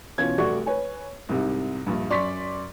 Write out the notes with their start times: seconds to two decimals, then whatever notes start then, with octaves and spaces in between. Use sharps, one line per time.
0.18 B2 E3 C#4 F4 G#6
0.38 F1 G3 A3 F#4 D5 C#6
0.66 B4 C#5 G#5
1.29 C2 G#2 C3
1.87 A#1 G2
2.10 F#2 D5 C6 C#6 B6